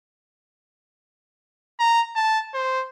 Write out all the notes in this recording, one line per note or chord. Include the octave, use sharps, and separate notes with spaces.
A#5
A5
C5